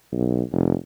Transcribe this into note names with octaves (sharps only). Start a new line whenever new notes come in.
B1
F1